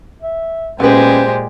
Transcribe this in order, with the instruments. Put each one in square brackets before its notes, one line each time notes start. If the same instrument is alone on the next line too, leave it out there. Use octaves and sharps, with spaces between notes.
[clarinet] E5
[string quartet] A#2 G#3 G4 [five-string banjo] B3 B4 [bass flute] C#4 [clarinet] C5